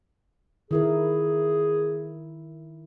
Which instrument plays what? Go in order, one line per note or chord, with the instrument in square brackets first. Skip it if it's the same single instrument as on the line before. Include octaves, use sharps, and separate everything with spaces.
[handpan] D#3 E4 A#4 [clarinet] G#4